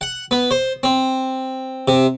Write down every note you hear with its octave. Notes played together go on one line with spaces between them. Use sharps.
F#5
B3
C5
C4
C3